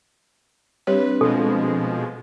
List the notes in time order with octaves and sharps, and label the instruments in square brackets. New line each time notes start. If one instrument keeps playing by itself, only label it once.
[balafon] G3 G4 C#5 [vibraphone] C4 D4 [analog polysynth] B4
[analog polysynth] B2 F3 G#3 [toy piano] A4